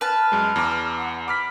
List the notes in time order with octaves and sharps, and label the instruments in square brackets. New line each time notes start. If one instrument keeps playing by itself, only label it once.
[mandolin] B4 A5 [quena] F6
[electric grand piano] F#2 G#3
E2 A#5 D6
[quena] F#5
[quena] B5 [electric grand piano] D6 F6 B6